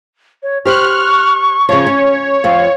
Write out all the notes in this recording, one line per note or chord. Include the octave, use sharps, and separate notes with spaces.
C#5
G4 C5 C#6 F6 F#6
C#3 F3 C#5
C#4
F2 C4 F5